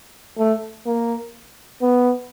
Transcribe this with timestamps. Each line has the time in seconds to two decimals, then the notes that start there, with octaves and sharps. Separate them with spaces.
0.38 A3
0.86 A#3
1.82 B3